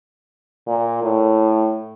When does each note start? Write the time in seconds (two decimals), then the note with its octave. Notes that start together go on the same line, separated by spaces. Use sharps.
0.67 A#2
1.03 A2